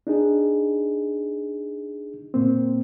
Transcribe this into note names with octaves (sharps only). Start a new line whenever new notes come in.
D4 D#4 G#4
A#2 A#3 C4